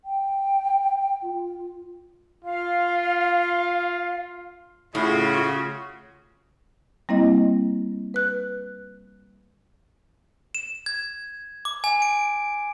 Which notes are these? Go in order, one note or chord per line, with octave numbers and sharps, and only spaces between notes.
G5
F4
F4 F5
A2 C#3 F4 F#4
G3 A#3 C4 E4 D#5
B4 F#6
E7
G#6
D6
G#5
D7